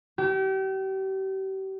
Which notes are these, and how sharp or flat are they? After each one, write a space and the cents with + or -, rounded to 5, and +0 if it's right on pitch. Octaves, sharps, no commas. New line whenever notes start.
G4 -35